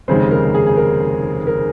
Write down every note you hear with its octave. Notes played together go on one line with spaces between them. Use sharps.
F1 D#2 C#3 G#3 C4 D#4 C5
A#4
G#4
G#4
A#4
A#4